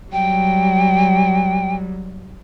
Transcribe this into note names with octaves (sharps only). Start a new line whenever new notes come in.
F#3 G3 G5